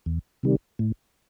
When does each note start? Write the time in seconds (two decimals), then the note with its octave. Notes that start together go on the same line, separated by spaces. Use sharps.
0.06 E2
0.43 C3 D#3 G3
0.79 A2